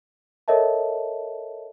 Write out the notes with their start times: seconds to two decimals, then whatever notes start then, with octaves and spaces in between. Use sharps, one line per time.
0.48 A4 A#4 C#5 D#5 E5 A5